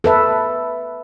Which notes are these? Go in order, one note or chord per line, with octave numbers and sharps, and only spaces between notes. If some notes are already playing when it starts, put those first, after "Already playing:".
A4 B4 E5